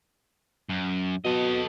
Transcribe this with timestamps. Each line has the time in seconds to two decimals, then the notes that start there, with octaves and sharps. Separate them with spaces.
0.69 F#2
1.25 B2 A4 D#5